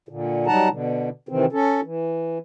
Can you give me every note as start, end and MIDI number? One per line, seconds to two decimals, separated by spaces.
0.09 0.47 46
0.09 0.47 50
0.47 0.68 54
0.47 0.68 55
0.47 0.68 63
0.47 0.68 78
0.47 0.68 81
0.47 0.68 82
0.69 1.09 47
0.69 1.09 50
1.29 1.45 48
1.29 1.45 51
1.29 1.45 52
1.29 1.45 60
1.53 1.81 61
1.53 1.81 69
1.84 2.38 52